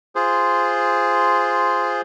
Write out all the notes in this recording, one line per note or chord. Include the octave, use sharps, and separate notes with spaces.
F4 G#4 C5